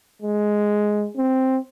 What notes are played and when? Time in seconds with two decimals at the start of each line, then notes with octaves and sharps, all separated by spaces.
0.22 G#3
1.17 C4